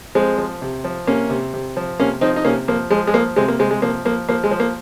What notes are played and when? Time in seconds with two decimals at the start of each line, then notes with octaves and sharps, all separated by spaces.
0.15 F3 G#3 C4
0.38 F3
0.62 C3
0.84 F3
1.07 C3 A#3 C#4
1.30 C3
1.54 C3
1.77 F3
2.00 C3 A#3 C#4
2.21 F3 C4 D#4
2.36 D#4
2.45 C3 A#3 C#4
2.68 F3 A#3
2.91 F3 G#3
3.07 G#3
3.14 F3 A#3
3.36 C3 G#3 C4
3.48 A#3
3.59 C3 G#3 C4
3.71 G#3
3.82 F3 A#3
4.05 F3 A#3
4.29 F3 A#3
4.44 G#3
4.51 F3
4.60 A#3